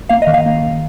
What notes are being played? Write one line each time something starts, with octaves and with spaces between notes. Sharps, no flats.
A#3 F5
D#5
D#3
F5
A#3
D#3